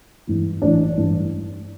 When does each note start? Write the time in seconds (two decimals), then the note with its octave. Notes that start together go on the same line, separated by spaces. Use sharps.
0.27 G2 E3
0.62 A1 D4
0.97 G2 E3